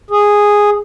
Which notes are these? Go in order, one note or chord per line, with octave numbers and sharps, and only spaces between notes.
G#4